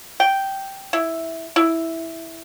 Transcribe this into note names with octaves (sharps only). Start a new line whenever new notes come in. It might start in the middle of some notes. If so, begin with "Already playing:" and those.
G5
E4
E4